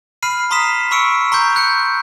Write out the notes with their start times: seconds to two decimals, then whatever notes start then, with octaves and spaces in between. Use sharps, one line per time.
0.23 B5 F6 C7 D#7
0.51 A#5 C6 D#6 B6 E7
0.91 B5 C#6 E6 C#7 D7
1.32 A#5 C6 C#6 G6
1.56 F#6 G6 C#7